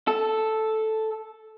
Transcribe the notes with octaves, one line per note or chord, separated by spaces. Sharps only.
A4